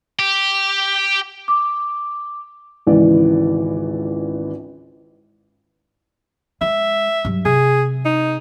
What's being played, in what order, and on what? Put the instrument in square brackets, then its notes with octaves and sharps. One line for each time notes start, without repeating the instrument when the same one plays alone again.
[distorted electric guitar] G4
[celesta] D6
[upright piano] G#1 C#2 E3 D5
[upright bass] G#3 [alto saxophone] E5
[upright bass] G2 F#3
[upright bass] C3 [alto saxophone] G#4
[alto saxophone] D#4